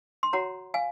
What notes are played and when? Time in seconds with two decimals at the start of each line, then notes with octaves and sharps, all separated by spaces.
0.23 C6
0.33 F#4 C#5 F#5 A#5
0.74 F5 G#5